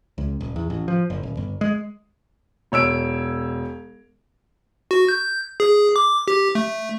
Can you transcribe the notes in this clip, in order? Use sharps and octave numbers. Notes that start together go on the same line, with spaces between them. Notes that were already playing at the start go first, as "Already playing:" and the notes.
C#2
D#1
E2
A1
F3
F#1
D#1
G1
G#3
E1 C#5 E6 D7
F#4
G6
G#4
D6
G4
A3